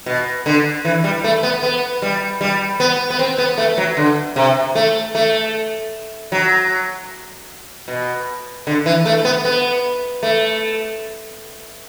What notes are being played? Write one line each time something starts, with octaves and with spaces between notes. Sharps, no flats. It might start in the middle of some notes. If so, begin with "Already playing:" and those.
B2
D3
E3
G3
A3
B3
B3
G3
G3
B3
B3
C4
B3
A3
F#3
D3
C3
A3
A3
F#3
B2
D3
E3
A3
B3
B3
A3